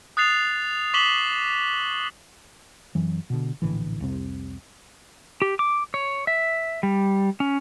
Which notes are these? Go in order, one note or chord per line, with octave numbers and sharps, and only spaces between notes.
D#6 F#6 A6 C7 F7
C#6 D6 B6 E7 F#7 G7
F#2 E3 F#3
B2 D3
A#1 A2 D3 E3
C2 F2 C3
G4
D6
C#5
E5
G3
C#4